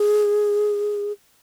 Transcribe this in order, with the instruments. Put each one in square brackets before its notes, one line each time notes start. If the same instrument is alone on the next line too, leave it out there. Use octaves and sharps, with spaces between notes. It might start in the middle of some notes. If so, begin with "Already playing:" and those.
Already playing: [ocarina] G#4